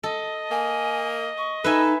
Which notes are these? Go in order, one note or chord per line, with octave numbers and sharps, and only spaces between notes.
A4 D#5
A#3 G#5
C#6
D#4 A4 B4 E5 G#5